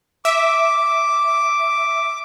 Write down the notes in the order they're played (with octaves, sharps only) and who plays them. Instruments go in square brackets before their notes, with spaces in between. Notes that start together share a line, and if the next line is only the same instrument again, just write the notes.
[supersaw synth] E5 [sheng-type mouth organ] D6